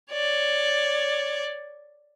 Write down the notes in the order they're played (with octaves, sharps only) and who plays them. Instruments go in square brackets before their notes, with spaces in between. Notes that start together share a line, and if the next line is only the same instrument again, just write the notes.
[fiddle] C#5 D5